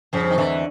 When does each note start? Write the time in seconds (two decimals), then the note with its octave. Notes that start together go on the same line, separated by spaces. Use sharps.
0.13 F2 C#3 F3
0.30 D#3
0.38 E2 D3 E3